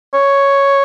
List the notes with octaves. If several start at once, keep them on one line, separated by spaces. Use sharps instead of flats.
C#5